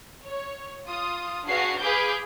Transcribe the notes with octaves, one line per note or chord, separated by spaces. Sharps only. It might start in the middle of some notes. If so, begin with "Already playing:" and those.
C#5
F4 D#6
D4 F#4 G#4 B4 F5 C7
G#4 B4 F5 B5 D6 G6